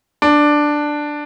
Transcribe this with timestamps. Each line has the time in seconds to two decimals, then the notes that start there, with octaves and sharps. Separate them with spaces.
0.22 D4